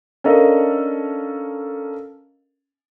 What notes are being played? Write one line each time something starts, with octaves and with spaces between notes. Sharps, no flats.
C#4 D4 A4 A#4 D#5 F5